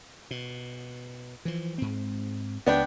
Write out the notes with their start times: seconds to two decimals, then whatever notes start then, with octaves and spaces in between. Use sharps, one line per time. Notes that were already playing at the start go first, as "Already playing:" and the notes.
0.31 B2
1.45 E3 F3
1.78 G#2 C4
2.66 C#2 B3 D4 G5